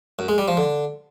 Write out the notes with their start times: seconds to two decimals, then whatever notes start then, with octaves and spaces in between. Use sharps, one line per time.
0.19 F#2
0.28 G#3
0.38 G3
0.48 F3
0.57 D3